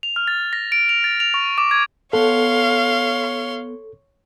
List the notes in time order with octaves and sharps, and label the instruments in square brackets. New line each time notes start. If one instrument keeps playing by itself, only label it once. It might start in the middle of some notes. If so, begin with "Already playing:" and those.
[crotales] F7
F6
A6
A#6
D7
F7
A6
F7
C#6
D6
G#6
[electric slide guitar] B3 F#5 [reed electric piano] A4 [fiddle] C#5 C6 [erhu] F5